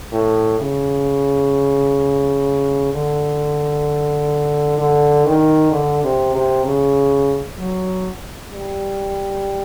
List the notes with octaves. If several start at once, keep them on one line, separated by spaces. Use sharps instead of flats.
A2
C#3
D3
D3
D#3
D3
C3
C3
C#3
F#3
G3